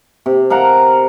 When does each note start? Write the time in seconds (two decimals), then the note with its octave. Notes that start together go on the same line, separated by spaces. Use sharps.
0.26 C3
0.50 A#4 F5 F#5 A#5